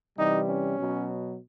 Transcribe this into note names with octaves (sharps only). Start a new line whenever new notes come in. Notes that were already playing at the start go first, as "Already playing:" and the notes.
C3 E3 G3 D#4
C#4
B2 F#3